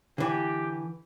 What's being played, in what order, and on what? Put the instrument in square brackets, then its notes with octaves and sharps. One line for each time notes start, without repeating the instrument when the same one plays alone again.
[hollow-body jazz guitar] D3 E3 [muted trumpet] G4